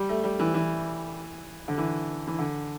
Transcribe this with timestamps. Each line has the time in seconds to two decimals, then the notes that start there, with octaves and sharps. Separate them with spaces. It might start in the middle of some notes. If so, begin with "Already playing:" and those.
Already playing: G3
0.09 A3
0.24 G3
0.39 E3
0.54 E3
1.68 D3
1.78 E3
2.27 E3
2.39 D3